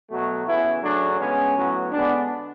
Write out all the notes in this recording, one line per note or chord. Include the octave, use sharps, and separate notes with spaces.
B2 F#3 A3
C#3 E3 B3 E4
C#3 F#3 A3 D4
C#3 G#3 B3 C#4
A2 F#3 B3
D3 G#3 B3 D4